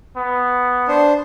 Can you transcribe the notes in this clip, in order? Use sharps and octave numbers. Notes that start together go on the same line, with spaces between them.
B3
D4 C5